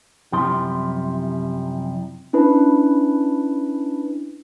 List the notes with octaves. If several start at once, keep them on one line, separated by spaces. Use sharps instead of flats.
F#2 C3 F3 G3 E4 C6
C#4 D4 E4 B4